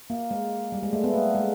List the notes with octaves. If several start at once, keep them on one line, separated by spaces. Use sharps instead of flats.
A#3
G#3
G3
G#3
A3
B3
A#3
G#3